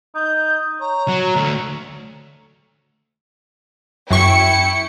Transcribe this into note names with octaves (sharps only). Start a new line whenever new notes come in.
D#4 G6
C#5 A#5
F#3
D2 A3
F#2 E4 G5 C#6 C#7